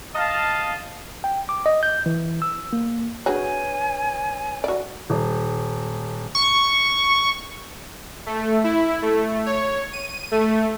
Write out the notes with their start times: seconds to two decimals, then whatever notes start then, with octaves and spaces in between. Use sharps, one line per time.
0.15 D#5 F5 A5
1.24 G5
1.49 D6
1.66 D#5
1.83 G6
2.06 E3
2.42 E6
2.73 A#3
3.26 D4 F#4 G#4 B4 C#5 G#5
4.64 F#4 D5
5.10 D#1
6.35 C#6
8.26 A3
8.64 E4
9.02 A3
9.46 C#5
9.92 D#7
10.31 A3